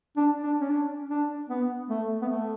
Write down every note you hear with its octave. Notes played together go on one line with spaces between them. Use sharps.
D4
D4
C#4
D4
D4
B3
A3
B3
A3